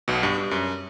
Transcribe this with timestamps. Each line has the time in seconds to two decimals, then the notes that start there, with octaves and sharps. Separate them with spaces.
0.08 B1 B2
0.23 G2
0.38 G2
0.51 F#2